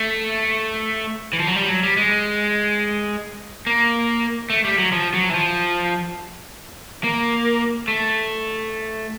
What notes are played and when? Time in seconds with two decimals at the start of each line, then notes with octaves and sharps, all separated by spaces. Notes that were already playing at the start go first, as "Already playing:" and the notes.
Already playing: A3
1.33 E3
1.40 F3
1.47 F#3
1.56 G3
1.69 F#3
1.83 G3
1.97 G#3
3.67 A#3
4.50 A3
4.65 G3
4.78 F#3
4.93 F3
5.14 F#3
5.29 E3
5.34 F3
7.04 A#3
7.88 A3